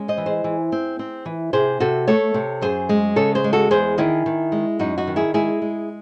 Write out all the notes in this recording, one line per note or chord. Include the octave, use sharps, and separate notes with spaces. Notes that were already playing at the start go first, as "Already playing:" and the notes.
Already playing: G#3 C#4
C5 D#5
E3
G#4 C5
E3
C4
C4
E3
C3 G#4 C5
C3 F#4 A4
A3 A4 C#5
C3
F#2 G#4 C5
G#3
C#3 A4 C#5
G#4 C5
G#3
F#4 A4
E2 G#4 C5
D#3 E4 G#4
D#3
G#3
F#2 D#4 F#4
D#4 F#4
D#3
E4 G#4
G#3 E4 G#4
G#3